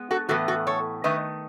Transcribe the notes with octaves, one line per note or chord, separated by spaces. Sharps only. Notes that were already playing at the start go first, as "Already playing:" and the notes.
Already playing: G#3 B3
F#4 A4
A2 E3 B3 F#4 A4
F#4 A4
A4 C#5
D#3 A3 B4 D#5